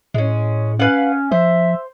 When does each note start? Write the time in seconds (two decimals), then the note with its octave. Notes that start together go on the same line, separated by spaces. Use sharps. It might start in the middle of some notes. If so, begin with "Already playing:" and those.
0.14 A2 G#3 C#4
0.80 C#4 B4 F5 F#5
1.32 F3 C5 E5